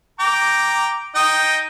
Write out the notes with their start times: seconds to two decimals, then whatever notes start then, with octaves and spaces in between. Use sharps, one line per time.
0.20 G5 A#5 D6
1.15 D#4 D#5 G5